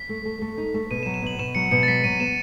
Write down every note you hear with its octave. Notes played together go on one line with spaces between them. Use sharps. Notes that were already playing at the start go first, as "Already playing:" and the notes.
Already playing: B6
A3
A3
A3
D#4
A3
B2 D#7
E7
F#3
E7
B2 F#7
B2 E7
F#3 C#7
B2 C#7
A6
F#3 B6
F#3 D#7
B3 E7